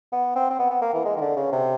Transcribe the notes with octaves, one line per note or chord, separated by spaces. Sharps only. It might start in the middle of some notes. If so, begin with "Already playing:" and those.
B3
C4
C4
B3
B3
A#3
E3
G#3
D#3
D3
C#3
C3